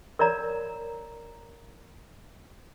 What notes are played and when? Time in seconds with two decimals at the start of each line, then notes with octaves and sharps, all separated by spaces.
0.19 A#4 C#5 D5 A#5